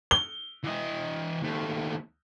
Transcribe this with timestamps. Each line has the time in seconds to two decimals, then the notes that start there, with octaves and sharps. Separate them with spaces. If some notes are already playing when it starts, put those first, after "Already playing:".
0.11 G7
0.64 E3 D#5
1.42 D#2 A3